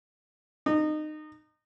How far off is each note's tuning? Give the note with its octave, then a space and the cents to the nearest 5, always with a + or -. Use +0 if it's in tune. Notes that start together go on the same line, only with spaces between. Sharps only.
D#4 -25